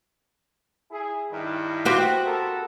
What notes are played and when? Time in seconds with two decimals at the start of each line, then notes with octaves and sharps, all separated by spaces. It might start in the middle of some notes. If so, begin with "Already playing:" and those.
0.90 E4 G#4
1.31 G2 D#3 E4
1.85 F#4 G4 C5
2.24 B3 A4 A#4